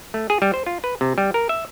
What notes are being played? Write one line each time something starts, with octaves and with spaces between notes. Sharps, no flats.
A3
G#4
G3
C5
F4
B4
C3
G3
A#4
E5